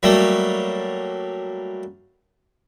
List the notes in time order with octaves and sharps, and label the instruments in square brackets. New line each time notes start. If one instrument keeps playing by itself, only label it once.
[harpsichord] F#3 G3 A3 A#3